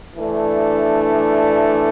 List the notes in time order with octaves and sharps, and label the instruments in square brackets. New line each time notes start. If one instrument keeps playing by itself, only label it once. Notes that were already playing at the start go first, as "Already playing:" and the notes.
[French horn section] E3 A3 D4